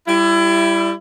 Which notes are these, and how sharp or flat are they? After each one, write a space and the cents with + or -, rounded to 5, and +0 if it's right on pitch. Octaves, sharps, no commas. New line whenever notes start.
G3 +0 E4 +25